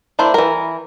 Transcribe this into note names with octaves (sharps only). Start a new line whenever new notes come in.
A#3 D4 E4 C5
E3 A#4